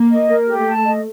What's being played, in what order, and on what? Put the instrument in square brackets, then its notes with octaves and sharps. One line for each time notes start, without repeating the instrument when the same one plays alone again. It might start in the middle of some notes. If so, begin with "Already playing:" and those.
Already playing: [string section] A#3
[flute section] D#5
A#4
[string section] A3 [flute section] G4
[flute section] A5
D#5